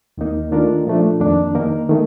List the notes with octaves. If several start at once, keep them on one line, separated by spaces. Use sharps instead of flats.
D#2 D#3 A#3 D#4
D#3 A3 D4 F4 A#4
A#2 F3 A3 D4
F2 D#3 A#3 D4
D#3 A#3 D#4 A#4
D#3 A3